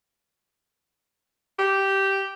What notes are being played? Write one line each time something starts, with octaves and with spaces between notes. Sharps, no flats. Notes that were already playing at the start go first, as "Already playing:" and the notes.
G4